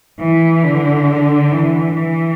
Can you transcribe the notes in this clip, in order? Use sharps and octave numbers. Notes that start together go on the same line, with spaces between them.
E3
D3
E3
E3